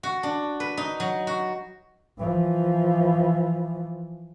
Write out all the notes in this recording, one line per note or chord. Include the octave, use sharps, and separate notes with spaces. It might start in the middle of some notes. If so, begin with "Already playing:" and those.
F#4
D4
B4
D#4
F#3
F#4
E3 F3